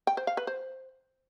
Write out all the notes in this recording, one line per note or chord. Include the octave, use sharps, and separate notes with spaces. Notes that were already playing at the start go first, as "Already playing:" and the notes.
G5
C5
F5
B4
C5